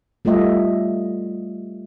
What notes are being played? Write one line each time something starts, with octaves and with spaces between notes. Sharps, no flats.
G3 A3 F4 D#5 E5